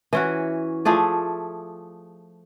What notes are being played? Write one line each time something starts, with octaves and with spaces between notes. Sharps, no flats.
E3 C#4 F#4
F3 A3 G#4 D5